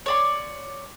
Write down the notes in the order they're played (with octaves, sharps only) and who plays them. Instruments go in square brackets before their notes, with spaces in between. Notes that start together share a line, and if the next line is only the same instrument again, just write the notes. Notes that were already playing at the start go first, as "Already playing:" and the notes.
[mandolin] C#5 D5 C6